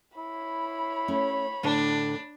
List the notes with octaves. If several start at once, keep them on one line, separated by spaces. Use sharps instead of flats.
E4 C#5 B5
A3 C#4
A2 D3 D4